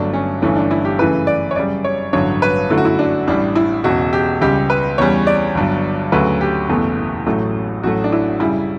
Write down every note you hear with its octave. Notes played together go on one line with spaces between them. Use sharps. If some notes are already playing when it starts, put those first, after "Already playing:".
Already playing: G1 G2 F#3 A3 D4
C#4
G1 G2 E3 A3 C#4
D4
E4
G4
F#2 C#3 E3 A3 B4
D5
C#5
F#2 C#3 G3 D5
C#5
A1 G2 D3 F#3 C#5
B4
F#2 D3 F#3 A3 E4
F#4
E4
D4
A1 A2 G3 D4
E4
E1 E2 C#3 F#4
G4
C#2 C#3 G3 G4
B4
E2 C#3 G3 C#5
D5
G1 G2 F#3
D2 C#3 F#3 A3 B4
G4
F#1 E2 B2 A3
A1 A2 F#3 A3
A1 A2 F#3 A3 F#4
D4
E4
F#2 C#3 G3 E4